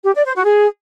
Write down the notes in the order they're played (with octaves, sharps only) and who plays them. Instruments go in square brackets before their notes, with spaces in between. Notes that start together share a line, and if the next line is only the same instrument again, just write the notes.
[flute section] G4
D5
C5
F#4
G#4